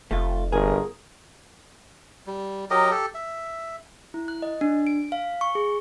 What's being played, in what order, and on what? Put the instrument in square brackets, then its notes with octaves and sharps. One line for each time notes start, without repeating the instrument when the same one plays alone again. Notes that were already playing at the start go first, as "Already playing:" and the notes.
[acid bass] F1 [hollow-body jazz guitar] A3 F4
[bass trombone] G1 [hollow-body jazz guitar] G#4 [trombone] A#4
[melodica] G3
F#3 G4 A#4 D#5
G4 A4
E5
[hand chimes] E4
F#6
D#5
D4
D7
F5
C#6
G#4